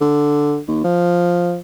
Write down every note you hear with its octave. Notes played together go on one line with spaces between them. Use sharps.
D3
D#2
F3